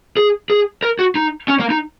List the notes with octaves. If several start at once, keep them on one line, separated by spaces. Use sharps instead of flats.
G#4
G#4
A#4
F#4
D#4
C#4
A#3
D#4